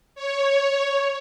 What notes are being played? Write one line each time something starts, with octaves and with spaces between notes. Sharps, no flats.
C#5